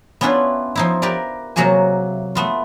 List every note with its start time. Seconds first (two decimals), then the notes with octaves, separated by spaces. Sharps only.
0.21 B3 C#4 D4 E4 F4 B4
0.75 F3 D#4 E4
1.02 G4 A#4 B4 D5
1.56 C3 F#3 A#3 F#4 G#4 G#5
2.35 A3 B3 F4